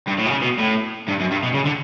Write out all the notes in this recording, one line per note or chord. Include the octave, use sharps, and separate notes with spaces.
G2
A2
B2
C#3
B2
A2
G2
F#2
G2
B2
C#3
D3